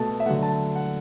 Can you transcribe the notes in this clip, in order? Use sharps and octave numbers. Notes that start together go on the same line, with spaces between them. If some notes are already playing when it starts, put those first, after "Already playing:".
Already playing: B2 A3 A5
E5
D3 F#3 A3 F#5
A5
F#5